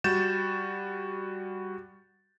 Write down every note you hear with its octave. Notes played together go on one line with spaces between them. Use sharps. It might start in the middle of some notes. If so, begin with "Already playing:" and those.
G3 F#4 G6 A6 E7